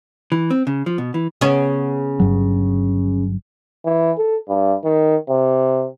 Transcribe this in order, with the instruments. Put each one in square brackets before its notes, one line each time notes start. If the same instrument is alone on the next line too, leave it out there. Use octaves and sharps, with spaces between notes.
[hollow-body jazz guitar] E3
C4
C#3
F3
B2
E3
[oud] C#3 B3 C#4
[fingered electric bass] G1 G2 F#3
[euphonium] E3
A4
G2
D#3
C3